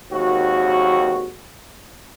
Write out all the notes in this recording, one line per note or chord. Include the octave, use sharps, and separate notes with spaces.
G#1 D#2 F#4